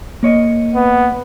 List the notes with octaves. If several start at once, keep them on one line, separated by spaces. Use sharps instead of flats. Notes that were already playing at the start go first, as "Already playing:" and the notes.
A#3 C#5 D#5
B3